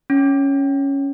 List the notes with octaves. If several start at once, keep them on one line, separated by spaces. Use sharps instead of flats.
C#4